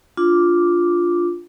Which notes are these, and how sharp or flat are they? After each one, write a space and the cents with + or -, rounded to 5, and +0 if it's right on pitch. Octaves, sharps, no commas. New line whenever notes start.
D4 -5 F4 +0 D6 +0